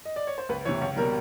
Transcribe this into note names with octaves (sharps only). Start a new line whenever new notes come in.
D#5
D5
C#5
C5
C#2 B4
C3 E3 C#5
C#2 C#5
B2 G3 A#4